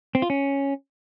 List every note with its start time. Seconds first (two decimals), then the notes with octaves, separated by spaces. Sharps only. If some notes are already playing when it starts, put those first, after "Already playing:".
0.15 C4
0.22 F4
0.30 C#4